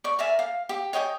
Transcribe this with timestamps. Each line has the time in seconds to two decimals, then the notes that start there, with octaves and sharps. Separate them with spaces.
0.04 D5 C#6
0.19 A#4 D5 E5 G#5
0.39 F5
0.69 G4
0.93 C#5 D#5 G5 G#5